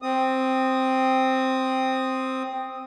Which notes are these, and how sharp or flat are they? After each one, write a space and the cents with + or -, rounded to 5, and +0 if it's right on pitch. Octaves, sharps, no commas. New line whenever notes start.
C4 +0 D#6 +0